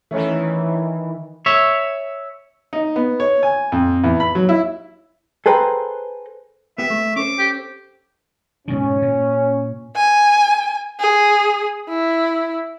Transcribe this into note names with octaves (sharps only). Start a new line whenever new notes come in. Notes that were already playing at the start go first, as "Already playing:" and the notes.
D#3 E3 A3 C#4 A4
C#5 E5
D#4
B3
C#5
G#5
F2
E2
B5
F#3
E4
G#4 A4 B4 C5 G5 A#5
B3 G4 E5
A3
C#4 A4 C5 D6
G4
G#2 B2 D#3 C#4
A#2
G#5
G#4
E4